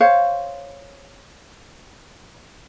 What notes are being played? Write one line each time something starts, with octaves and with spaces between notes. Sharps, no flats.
C5 C#5 F5